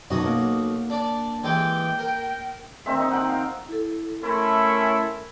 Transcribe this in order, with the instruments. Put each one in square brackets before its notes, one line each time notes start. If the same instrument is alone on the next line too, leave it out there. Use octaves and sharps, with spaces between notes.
[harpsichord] B1 F#4 D#5 [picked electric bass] F#2 B2 F#3
[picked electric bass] A#3
[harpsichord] D4 D5
[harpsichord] E3 G#3 G4 [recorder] G5
[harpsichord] A#4
[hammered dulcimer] D#3 C4 E5
D#4
F#5 G5 A#5
F5
[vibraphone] E4 A4
[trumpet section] A3 C#4 E4 [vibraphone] A#4 C6